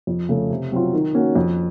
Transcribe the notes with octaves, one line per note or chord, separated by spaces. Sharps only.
F2
C#3 A3
C3
F#3 C4 F4
D#3
A#3 C#4 F#4
F2